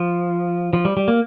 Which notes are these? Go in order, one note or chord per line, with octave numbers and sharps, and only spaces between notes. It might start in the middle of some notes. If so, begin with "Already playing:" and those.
Already playing: F3
F3
G3
G3
A#3